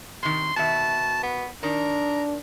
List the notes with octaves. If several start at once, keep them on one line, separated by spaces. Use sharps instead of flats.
C3 D#3 C6
B2 D#3 E5 A5
B3
D#3 D4 A#4